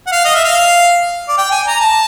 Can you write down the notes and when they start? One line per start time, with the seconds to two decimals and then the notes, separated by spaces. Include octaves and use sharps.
0.06 F#5
0.11 F5
0.25 D#5
0.35 E5
0.44 F5
1.28 D5
1.38 G5
1.51 G#5
1.67 A#5
1.80 A5